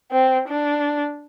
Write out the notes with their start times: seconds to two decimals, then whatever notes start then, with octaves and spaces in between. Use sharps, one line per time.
0.12 C4
0.48 D4